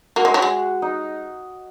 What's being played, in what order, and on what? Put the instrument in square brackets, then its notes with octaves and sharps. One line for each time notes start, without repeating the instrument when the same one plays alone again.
[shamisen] A#3 [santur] F#4
[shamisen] G#3
F#3
G#3
[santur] D#4